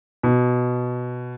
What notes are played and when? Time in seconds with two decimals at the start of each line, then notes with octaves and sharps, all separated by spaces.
0.23 B2